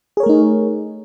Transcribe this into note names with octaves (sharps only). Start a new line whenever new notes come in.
A3 D#4 G#4 A#4 C#5